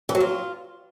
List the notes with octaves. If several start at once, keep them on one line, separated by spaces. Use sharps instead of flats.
E3
F#3
F4